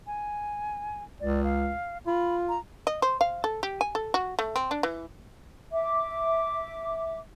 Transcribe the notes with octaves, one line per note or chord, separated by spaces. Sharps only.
G#5
C#2 D5
F5
F4 B5
A#5
D#5
C5
F5
A4
G4
G#5
A4
F#4
A3
C4
D4
E3
E5 D6